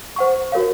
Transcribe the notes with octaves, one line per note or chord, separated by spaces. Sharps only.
C5 F#5 C#6
F#4 A#4 C#5 F5